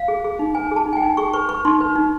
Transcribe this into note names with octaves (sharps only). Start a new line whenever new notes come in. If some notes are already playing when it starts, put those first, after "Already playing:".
Already playing: F5
G#4
G#4
D#4
B4 G#5
G#4 A5
D#4
G#5
G5
D#4
G#4 C#6
B4 C#6
B4 C#6
D#4 C6
B4
D#4